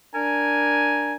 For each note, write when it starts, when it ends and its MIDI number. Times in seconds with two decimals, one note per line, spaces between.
0.14 1.16 62
0.14 1.16 70
0.14 1.16 80